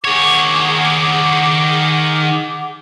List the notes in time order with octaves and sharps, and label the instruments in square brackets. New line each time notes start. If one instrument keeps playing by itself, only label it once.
[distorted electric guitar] D#3 C#5 [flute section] G#4 F#5 D6